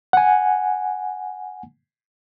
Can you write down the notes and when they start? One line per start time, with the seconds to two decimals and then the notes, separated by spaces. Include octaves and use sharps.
0.13 F#5 G#5